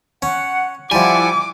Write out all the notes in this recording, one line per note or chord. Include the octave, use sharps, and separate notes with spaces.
C#4 F#5
F3 G3 E4 F#5 G#5 D6